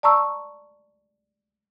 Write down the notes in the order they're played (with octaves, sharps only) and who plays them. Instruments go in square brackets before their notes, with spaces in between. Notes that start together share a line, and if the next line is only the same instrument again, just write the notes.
[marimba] D5 A5 A#5 C#6 E6